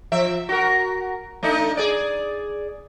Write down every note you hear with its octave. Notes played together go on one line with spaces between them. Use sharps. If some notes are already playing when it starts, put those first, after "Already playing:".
F3 E5
F#4 A#4
A3 D4 D#4
G#4 D5